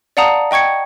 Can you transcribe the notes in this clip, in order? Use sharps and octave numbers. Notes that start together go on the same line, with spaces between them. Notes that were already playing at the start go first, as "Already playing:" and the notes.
D5 F5 F#5 A5 A#5 D#6
D#5 G5 C#6 G#6 C#7